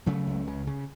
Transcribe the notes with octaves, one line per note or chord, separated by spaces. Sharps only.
C#3 F#3 A3
C#2
C#3
C#3